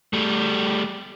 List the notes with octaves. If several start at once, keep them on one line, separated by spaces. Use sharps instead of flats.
G3 A3